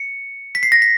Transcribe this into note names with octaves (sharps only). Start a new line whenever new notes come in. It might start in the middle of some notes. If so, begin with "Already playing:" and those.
Already playing: C#7
B6
C7
A#6
B6